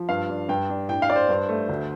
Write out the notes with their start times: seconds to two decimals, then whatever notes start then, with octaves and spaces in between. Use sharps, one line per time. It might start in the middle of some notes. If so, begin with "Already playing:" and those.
Already playing: F3
0.09 G2 F5
0.29 D4
0.49 G2 G5
0.69 D4
0.89 A2 G5
1.02 F5
1.10 D4 D5
1.16 C5
1.29 G2
1.49 A3
1.69 D2